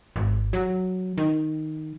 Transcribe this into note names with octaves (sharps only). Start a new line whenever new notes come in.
G#1
F#3
D#3